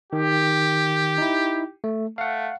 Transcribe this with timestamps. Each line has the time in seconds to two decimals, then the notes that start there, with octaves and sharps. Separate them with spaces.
0.13 D#3 G4
1.18 D#4 E4
1.84 A3
2.18 A3 F5 F#5